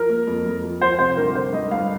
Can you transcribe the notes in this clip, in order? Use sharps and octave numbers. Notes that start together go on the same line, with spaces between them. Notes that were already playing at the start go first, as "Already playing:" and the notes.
Already playing: F3 A#4
A#3
F2
F2
F3
F3 C5
C3 C5
G1 A#4
G1 C5
G2 D#5
G2 F5